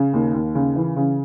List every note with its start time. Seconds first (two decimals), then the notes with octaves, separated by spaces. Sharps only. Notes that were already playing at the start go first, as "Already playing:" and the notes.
Already playing: C#3
0.13 D#2
0.34 D#2
0.55 C#3
0.76 E3
0.96 C#3